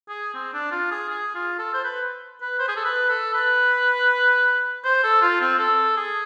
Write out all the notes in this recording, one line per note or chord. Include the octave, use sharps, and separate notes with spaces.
G#4
C4
D4
F4
G#4
G#4
F4
A4
C5
B4
B4
C5
G#4
A4
B4
A4
B4
C5
A4
F4
C4
A4
G#4